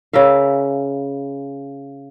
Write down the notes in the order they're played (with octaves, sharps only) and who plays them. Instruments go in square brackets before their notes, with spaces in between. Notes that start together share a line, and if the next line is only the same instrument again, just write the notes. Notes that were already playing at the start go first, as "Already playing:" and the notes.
[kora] C#3 A#4 E5 F5